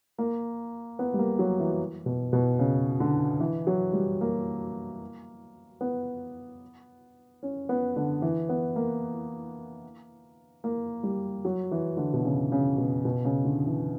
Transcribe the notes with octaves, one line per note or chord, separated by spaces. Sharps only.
A#3
B3
G3
A#3
F#3
E3
B2
B2
C#3
D3
E3
F#3
G3
A#3
B3
C#4
B3
D3
E3
B3
A#3
A#3
G3
F#3
E3
D3
B2
C#3
C#3
B2
B2
C#3
D3
E3